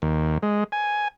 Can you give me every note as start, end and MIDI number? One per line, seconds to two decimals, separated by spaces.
0.02 0.38 39
0.43 0.64 56
0.72 1.08 80